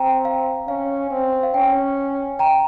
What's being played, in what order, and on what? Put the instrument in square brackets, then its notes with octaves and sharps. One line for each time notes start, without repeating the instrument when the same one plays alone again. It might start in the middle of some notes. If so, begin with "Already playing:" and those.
Already playing: [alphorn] C4 [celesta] G5 A#5
[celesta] F5
[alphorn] C#4 [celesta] F5
[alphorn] C4
[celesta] F5
[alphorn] C#4 [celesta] G5
[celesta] G5 A#5